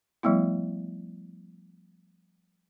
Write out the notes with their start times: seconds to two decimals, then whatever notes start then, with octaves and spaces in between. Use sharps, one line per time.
0.23 F3 G3 A3 B3 E4